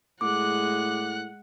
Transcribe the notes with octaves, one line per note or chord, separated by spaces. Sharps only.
A2 G#3 F#5 D6 F#6